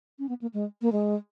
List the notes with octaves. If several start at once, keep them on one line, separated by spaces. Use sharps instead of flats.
C#4
B3
A#3
G#3
A#3
G#3